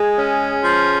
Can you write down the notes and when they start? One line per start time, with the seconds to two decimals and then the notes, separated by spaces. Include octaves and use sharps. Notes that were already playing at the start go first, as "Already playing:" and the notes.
Already playing: G#3 G#4
0.18 C#4
0.63 F3